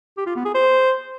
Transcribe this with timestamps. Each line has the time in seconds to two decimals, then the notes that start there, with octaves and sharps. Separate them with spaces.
0.17 G4
0.26 F4
0.36 B3
0.45 G#4
0.54 C5